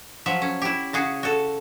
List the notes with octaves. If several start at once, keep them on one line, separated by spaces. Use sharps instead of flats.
F3 F#3 E5
C#4
E4 G4
C#3 F#4 G#4
F#4 A4